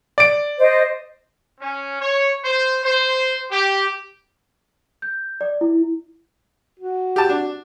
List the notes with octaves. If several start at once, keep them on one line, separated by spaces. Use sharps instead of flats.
D5 D7
C5 D#5
C#4
C#5
C5
C5
G4
G6
D5
E4
F#4
G4 A5
D4